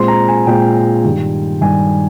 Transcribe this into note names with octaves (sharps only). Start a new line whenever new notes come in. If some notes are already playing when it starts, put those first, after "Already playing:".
Already playing: A#2 G#3 C4 C6
A#5
G#5
A#2 G#3 C4 G5
G2 D#3 G3
G2 D#3 G3 G#5